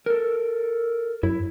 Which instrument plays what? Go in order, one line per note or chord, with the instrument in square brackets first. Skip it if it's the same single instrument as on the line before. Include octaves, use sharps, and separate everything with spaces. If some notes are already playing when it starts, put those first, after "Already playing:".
[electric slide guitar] A4 A#4
[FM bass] F#2 [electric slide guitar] E4